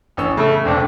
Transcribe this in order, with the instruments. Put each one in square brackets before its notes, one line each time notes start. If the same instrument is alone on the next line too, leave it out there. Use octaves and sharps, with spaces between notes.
[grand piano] A1 C#4 E6
[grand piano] C#3 [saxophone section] A3
[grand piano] E1 C#2 A4 [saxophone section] C4 D4